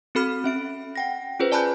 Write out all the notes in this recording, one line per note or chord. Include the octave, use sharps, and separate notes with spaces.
C4 F#4 A4 B5 F6
C#4 E5 D7
F#5 G5 A#6
C#4 F4 G#4 B4 C5
D5 G#5 A5 B5 F#6 G6